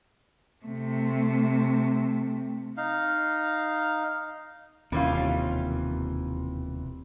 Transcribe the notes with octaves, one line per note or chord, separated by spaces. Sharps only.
C3 A3
D#4 F5
E1 D#2 C3 E3 G3 C#4 F4